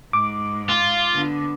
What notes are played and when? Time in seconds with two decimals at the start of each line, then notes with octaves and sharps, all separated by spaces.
0.13 G#2 D6
0.69 F4
1.14 D3 B3